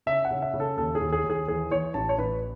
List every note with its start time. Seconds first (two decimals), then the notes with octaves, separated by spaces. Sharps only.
0.06 C#3 E5
0.25 F#5
0.31 C#3
0.42 E5
0.54 C#3
0.60 A4
0.77 D#2 A4
0.95 G#4
1.01 D#2
1.13 G#4
1.24 D#2
1.30 G#4
1.48 E3 G#4
1.71 E3 C#5
1.94 A1 A5
2.09 C#5
2.18 A1 B4